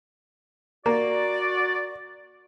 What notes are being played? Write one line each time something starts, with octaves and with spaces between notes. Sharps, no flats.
A#3 F#4 D5